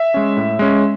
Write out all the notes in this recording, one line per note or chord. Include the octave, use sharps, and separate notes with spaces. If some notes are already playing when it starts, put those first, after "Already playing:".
Already playing: E5
G#3 C#4
A2
G#3 C#4